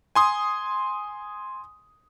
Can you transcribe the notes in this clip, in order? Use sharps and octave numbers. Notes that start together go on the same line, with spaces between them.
G#5 C6 D#6